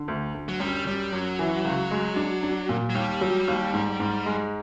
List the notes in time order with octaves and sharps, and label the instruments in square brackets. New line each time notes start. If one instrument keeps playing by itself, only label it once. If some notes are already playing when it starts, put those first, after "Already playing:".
Already playing: [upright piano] D3
D2
D2
[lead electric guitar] F#3
[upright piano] F#2 [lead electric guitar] G3
[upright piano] F#2 [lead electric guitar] G3
[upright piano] F#2 [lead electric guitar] F#3
[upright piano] E3
C#2
G#3
D4
D4
A#2
[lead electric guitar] F#3
[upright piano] D#2 [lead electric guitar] G3
[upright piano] F#3
D#2
G#2
G#2
G#3